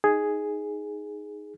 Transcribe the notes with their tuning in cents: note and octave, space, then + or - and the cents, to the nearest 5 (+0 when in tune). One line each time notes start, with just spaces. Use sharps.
D#4 +0 G#4 +0